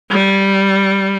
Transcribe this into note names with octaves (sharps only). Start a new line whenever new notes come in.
G3